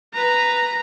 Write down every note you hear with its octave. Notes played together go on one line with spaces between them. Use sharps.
B4 A#5